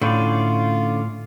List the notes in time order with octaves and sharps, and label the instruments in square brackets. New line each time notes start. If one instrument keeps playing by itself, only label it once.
[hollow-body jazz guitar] A2 [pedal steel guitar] D3 C#4 D5 [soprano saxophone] F4